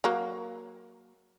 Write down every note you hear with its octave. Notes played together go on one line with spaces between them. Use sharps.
F#3 A#3